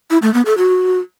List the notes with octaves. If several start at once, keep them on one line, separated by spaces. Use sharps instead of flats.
E4
A3
B3
A4
F#4